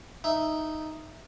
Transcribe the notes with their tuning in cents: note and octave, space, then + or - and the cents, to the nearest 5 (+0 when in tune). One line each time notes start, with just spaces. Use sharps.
D#4 +0 E5 +0